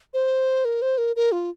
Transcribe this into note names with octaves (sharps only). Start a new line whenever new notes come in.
C5
A#4
C5
A#4
A#4
F4